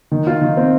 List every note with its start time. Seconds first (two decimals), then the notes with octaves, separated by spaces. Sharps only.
0.12 D#3
0.27 F4
0.41 D#3
0.57 C4